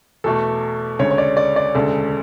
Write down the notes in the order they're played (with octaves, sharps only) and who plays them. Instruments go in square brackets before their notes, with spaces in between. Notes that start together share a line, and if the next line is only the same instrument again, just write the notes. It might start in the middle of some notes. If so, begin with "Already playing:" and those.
[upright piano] E2 B2 A3 [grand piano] A4
[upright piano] D2 C#3 G#3 [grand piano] C#5
[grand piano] C#5
D5
D5
D5
[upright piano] E1 D2 C#3 G#3 D4 [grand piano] A4